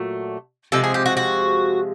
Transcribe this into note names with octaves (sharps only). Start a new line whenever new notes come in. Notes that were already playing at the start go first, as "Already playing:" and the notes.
Already playing: A#2 F#3 A3
C3 F3 G#3 A4
G#4
G4
F#4
F#4